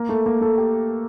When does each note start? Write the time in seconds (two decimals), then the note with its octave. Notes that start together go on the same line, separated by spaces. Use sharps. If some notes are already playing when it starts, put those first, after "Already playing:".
Already playing: A#3 A#4
0.09 A3 A4
0.26 A#3 A#4
0.41 A3 A4
0.58 G4